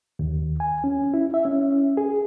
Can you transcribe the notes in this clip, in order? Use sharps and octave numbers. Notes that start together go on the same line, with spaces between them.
D#2
G#5
C#4
E4
E5
C#4
G#4